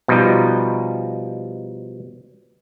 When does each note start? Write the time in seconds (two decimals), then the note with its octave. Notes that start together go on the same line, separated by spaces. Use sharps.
0.08 B2 F3 G3 D#4